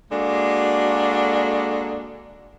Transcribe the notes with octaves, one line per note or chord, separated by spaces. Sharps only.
G#3 A#3 D4 F#4 A4